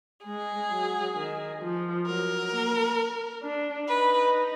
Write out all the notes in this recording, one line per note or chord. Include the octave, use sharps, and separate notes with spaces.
G#3 G#4
F#3
D#3
F3
F#3 A#4
A#3
D4
D#4 B4